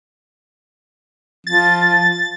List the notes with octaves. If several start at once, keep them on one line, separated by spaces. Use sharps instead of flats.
F3 A6